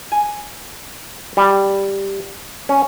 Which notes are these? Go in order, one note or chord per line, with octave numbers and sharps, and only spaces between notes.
G#5
G3
C#4